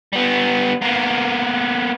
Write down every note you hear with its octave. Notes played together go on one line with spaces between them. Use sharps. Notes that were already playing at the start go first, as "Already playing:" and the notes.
G3 B3
A#3 B3